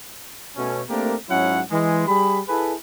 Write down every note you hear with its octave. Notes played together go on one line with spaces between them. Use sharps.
B2 A3 C#4
A3 A#3 C4 D4 G4 A#4
G#2 F#3 C#4 D#4 E4 F#5
E3 G#3
G3 G4 G#4 B5
E4 G#4 A4 B4